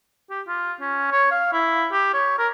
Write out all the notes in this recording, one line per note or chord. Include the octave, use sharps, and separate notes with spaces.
G4
F4
C#4
C#5
F5
E4
G4
C#5
A#4